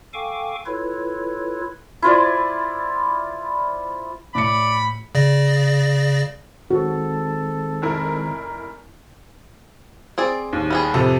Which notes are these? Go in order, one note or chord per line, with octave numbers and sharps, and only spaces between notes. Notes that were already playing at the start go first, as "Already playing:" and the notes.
A4 F5 G5 G#5 C#6 D6
E4 F4 A4 B4 C#5
E4 F4 C5 D5
A2 D5 B5 C#7
C#3 D5 A#6
D#3 G#3 C4 F#4 A4
F1 E4 A#4
C4 G#4 D5
D#2
G3 B3 G#4
F2 C3 A4